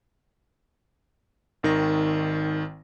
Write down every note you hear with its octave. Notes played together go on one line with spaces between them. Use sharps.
G#1 D#3 A#6